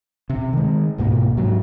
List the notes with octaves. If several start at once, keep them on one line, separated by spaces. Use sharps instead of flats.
C3
D#3 G#3
C2 G#2 B2 A#3
G#2 F#3